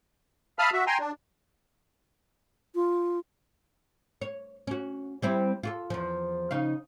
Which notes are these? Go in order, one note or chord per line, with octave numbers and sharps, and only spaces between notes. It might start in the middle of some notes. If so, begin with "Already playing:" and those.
E5 F5 A5 B5 D#6 F6
F#4 E5
G5 G#5 A#5 C6
D4
F4
C#5
C#4 F#4
G3 C4 E4
F4 F#4 A4
E2 F3
C#3 D#4 F5